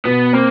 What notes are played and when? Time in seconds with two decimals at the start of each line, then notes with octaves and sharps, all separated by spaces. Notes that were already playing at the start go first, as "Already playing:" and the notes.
0.05 B2 B3
0.33 A#3 C4